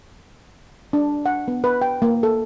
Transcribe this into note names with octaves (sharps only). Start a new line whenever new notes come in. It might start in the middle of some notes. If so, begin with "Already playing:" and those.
D4
F#5
B3
B4
G5
A#3
A4